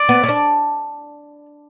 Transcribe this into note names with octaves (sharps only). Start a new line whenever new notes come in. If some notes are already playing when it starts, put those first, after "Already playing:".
Already playing: D5
B3
C#4
D4